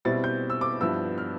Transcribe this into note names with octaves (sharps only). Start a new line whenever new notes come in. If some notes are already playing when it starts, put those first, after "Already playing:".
B2 G3 C4 E4 A6
G6
E6
D6
G2 F3 B3 E4 E6
F6